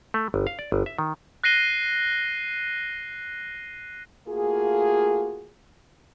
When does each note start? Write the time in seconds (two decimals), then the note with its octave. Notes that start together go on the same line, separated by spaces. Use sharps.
0.14 A3
0.34 G1
0.47 F5
0.59 D5
0.72 G1
0.86 E5
0.99 D#3
1.44 F#6 A#6 C7 D#7 G7
4.27 A3 A#3 F4 F#4 G#4